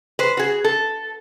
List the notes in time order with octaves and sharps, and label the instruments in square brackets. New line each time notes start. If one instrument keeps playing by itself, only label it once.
[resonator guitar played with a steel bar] B4 C5
F#4 G#4
A4